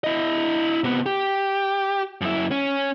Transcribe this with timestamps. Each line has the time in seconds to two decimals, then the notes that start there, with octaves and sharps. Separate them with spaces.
0.04 E4 D#5
0.84 C3 B3
1.06 G4
2.21 F#2 E4
2.51 C#4